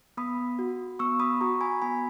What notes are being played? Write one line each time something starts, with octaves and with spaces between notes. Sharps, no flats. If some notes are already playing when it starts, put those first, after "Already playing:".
B3 B5 D#6
F#4
B3 C#6 E6
B5 D#6
F#4 A#5 C#6
G#5 B5
B3 G#5 B5